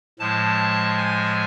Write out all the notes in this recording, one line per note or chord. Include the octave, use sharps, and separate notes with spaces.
A2 F3 G#3 A5
G#5